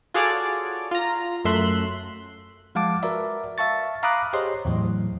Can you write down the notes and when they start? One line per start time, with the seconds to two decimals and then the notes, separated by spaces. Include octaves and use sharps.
0.14 F4 F#4 G#4 A4 C#5 D5
0.91 F4 A#5
1.45 F#2 A3 E5 C6 F#6
2.75 F3 G#3 F5 F#5 A5 D6
3.03 F#4 A#4 B4 D5 E5
3.58 E5 F5 A5 C#6 A6
4.03 F5 A#5 B5 D6 D#6 F#6
4.33 G4 G#4 C5 C#5 D#5 C6
4.65 E2 A2 E3 F#3